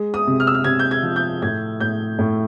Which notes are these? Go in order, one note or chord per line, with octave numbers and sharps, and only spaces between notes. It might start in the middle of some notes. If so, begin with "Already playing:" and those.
Already playing: G#3
D#6
C3
F6
E6
F6
C3 G#6
G6
G#6
F3
G6
A2 G#6
A2 G6
A2